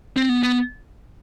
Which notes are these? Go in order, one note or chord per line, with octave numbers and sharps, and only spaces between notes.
C4
B3
B3